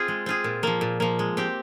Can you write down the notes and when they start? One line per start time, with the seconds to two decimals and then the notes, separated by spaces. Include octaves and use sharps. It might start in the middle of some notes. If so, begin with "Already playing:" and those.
Already playing: C4 F4 G#4
0.08 G#3
0.26 C4 F4 G#4
0.44 A#2
0.63 F3 A#3
0.81 A#2
1.00 F3 A#3
1.19 G#3
1.37 C4 G4